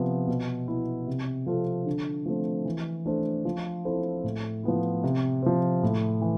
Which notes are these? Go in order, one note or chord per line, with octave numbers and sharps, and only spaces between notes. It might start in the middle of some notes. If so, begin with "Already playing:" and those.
Already playing: C3 F3 B3
B2
B3 E4
C3
F3 C4 F4 A4
D3
F3 A3 C4
E3
A3 D4 A4 C5
F3
C4 E4 A4 C5
A2
F3 B3 E4
C3
F3 C4
A2
E3